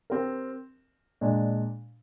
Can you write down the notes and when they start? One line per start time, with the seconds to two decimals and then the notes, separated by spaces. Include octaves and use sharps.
0.10 C4 G4 A#4
1.21 A#2 G#3 D4